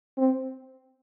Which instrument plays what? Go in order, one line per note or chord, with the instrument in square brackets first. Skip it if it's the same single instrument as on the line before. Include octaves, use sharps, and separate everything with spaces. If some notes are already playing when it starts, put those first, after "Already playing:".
[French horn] C4